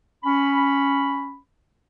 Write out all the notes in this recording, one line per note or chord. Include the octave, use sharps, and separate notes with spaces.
C#4 B5